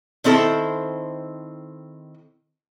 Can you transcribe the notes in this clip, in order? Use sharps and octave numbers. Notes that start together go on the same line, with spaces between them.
D#3 C4 E4 A4 C5